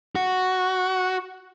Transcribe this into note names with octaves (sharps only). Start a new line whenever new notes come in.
F#4